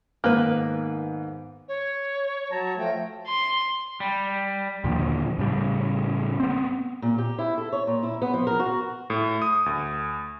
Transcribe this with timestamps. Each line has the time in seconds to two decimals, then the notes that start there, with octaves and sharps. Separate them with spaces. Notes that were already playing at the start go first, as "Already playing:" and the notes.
0.24 G#2 D#3 A#3 B3 B4
1.68 C#5
2.51 F#3 C#5 A5 A#5
2.78 F3 A3 G5
3.27 C6
4.00 G3
4.84 D#2 A#2 D3 F3
5.39 A2 C#3 G3
6.40 B3 C4
7.02 A#2
7.18 G4
7.39 E4
7.58 A4
7.72 C#5
7.87 A#2
8.03 E4
8.22 B3
8.34 F3
8.47 A#4
8.60 F#4
9.10 A2
9.42 D#6
9.66 D2